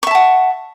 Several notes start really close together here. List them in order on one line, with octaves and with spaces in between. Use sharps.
C#6 E5 A5 F#5